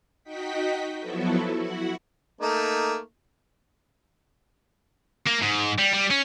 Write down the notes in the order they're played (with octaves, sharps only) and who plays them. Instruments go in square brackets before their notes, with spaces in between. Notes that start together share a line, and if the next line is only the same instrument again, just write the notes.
[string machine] D#4 F#4 D#5 G5 B6
F3 F#3 B3 E4 F#4 A4
E4 F#4 F#5
[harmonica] A3 A#3 D#4
[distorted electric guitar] A#3
G#2
G3
G3
C#4